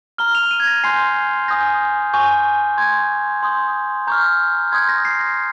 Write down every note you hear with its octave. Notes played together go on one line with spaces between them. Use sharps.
A#5 F6 G7
F7
D#7
G#6
A#6
G#5 C6 G6 C7
G#5 D#6 G6 A#6
G#5 C#6 G6
C6 G6 G#6
C6 D#6 G6
A#5 C#6 F6 G6
C6 D#6 G6 G#6
A#6
C7
A#6